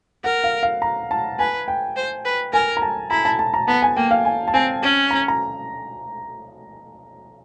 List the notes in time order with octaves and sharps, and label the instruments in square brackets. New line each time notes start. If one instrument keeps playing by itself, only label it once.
[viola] A#4 [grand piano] F#5
[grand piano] F5
F5
A#5
A5
[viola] B4 [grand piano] G#5
[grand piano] G5
[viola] C5
B4
[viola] A#4 [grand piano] G#5
[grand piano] A#5
A5
[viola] E4 [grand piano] A#5
[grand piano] A5
A5
A#5
[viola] B3 [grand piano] A5
[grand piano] G#5
[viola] A#3 [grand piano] G5
[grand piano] F5
G#5
A5
[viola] C4 [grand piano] G#5
[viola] C#4
[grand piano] A#5
A#5